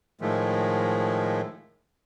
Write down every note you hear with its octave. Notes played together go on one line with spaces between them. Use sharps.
A2 D#3 F3 G#3 A3